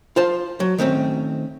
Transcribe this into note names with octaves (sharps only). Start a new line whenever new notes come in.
F4 C5 A5
F#3
D#3 A3 C4 C#4